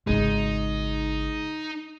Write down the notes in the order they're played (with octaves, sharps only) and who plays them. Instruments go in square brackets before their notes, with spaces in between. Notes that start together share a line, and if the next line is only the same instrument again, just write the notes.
[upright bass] G#1 C#3 [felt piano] G#3 [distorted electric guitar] D#4